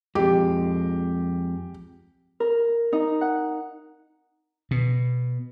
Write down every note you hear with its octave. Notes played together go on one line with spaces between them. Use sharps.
F2 G#3 G4
A#4
D#4
F#5
B2